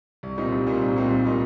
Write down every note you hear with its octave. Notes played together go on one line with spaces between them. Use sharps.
C2
A#2 G3 C4 D#4
C2
A#2 G3 C4 D#4
C2
A#2 G3 C4 D#4
C2
A#2 G3 C4 D#4